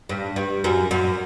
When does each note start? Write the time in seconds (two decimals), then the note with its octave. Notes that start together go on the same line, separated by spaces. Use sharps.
0.09 G2
0.36 G2
0.64 F#2
0.91 F#2